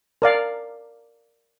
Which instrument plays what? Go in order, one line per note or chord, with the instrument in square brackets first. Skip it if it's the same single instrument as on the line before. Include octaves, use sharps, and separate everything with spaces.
[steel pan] A#4 D5 F5